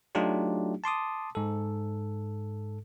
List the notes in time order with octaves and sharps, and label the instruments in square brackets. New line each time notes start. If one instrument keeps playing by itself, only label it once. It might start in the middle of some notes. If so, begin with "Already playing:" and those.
[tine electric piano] F#3 A3 D4 D#4 F4 G4
A5 C6 D6 D#6
G#2 A4